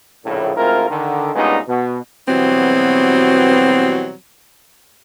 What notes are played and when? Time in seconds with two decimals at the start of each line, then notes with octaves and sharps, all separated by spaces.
0.24 A#1 A2 C#3
0.56 D2 G#2 C4 E4 F4 A#4
0.89 D3 D#3
1.34 G2 A#2 G#3 B3 C#4 D#4
1.67 B2
2.28 B2 E3 F#3 G3 B3 C4